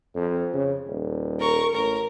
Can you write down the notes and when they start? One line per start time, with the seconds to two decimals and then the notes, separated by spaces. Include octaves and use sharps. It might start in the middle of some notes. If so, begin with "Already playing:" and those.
0.16 F2
0.54 C#3
0.88 D#1
1.39 A#4 C#6
1.74 A1 A#4